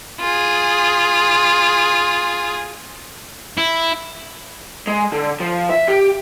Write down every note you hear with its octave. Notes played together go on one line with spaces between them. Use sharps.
F4 G#4
E4
G#3
D3
F3
E5
G4